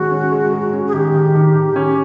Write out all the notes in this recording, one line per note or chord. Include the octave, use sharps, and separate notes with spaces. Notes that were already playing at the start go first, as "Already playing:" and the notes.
Already playing: D#3 G#3 C#4 F#4
C#4
G#3
G#3
C#4
G#4
D#3 G4
D#3
D#3
D#3
C#4